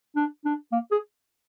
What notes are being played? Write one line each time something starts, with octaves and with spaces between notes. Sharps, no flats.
D4
D4
A#3
G#4